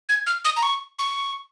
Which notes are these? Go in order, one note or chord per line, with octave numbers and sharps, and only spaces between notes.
G#6
F6
D#6
A#5
C#6
C#6